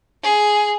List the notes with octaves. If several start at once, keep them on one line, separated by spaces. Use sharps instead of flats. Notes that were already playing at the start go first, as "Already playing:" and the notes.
G#4